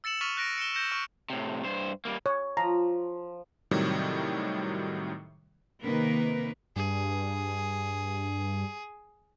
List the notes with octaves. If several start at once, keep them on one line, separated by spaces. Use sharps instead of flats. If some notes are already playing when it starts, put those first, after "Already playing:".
E6 A6 C#7 E7 F#7
C#6 F6 A6 B6 D#7 F7
F#6 A#6 D7
C#7 E7 G7
G6 A#6 C#7 E7
C#6 F6 D7
A2 C3
G2 C5
G3 A#3
C#5
F3 A#5
A2 C3 D#3 F#3 G3
C3 D#3 A#3 A#4 B4
G2 G#4